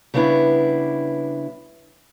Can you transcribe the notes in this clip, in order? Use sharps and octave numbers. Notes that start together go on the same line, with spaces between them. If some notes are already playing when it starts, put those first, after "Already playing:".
C#3 G3 B3 D4 E4